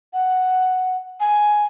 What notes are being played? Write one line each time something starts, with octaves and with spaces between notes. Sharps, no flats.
F#5
G#5